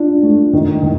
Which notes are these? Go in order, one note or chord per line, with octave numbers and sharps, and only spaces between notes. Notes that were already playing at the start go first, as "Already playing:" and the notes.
Already playing: D4 F4
A3
D#3
D#3